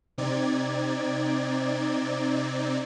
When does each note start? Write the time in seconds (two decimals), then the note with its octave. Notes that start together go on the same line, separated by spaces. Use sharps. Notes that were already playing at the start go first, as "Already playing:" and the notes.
0.18 C3 C4 D#4 D5 G#6